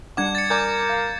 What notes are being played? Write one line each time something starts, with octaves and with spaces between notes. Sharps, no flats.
G3 D4 F#5 D6 G#6
A6 C#7
A#4 D5 G#5 D6 G6
F5